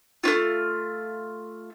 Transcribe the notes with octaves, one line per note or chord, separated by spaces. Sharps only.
A3 C#4 F4